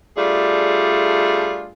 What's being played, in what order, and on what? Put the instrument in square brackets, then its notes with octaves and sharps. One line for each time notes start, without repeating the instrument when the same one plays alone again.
[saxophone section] G3 A3 D4 F4 G#4